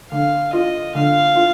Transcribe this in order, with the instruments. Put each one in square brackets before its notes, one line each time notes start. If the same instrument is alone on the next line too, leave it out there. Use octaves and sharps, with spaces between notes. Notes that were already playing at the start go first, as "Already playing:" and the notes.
[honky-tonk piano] D3 [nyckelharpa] F5
[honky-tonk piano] F4 [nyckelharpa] D#5
[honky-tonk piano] D3 [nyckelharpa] F5
[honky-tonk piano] F4